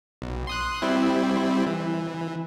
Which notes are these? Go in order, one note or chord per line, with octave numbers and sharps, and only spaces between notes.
B1
C6 D#6 F#6
G3 C4 E4
E3